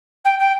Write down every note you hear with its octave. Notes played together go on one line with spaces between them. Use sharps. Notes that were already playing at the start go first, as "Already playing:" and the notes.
G5
G5